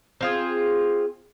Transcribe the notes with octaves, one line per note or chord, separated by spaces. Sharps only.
C4 F4 G#4